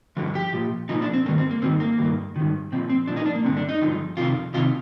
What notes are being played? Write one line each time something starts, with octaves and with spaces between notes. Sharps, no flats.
G2 D3 F3
G4
A#2 F3
A#2 F3 D#4
D4
C4
G2 D#3 A#3
C4
A#3
G2 D#3 C4
A#3
G2 D#3
G2 D#3
A#2 F3 C4
C4
A#2 F3 D4
D#4
D4
A#3
G2 D3 F3 C4
D4
D#4
G2 D3 F3
F2 C3 D#3 F4
C3 D#3 F4